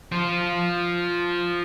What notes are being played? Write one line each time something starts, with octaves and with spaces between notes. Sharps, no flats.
F3 F4